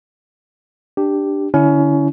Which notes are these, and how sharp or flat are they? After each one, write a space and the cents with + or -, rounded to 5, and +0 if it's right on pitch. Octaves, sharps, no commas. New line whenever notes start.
D4 +5 G4 +0
D3 +0 C#4 +25 E4 +0